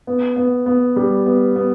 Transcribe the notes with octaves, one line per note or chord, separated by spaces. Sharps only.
B3
B3
B3
G3
B3
B3